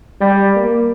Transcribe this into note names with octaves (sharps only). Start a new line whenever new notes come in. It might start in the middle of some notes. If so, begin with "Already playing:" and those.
G3
A#3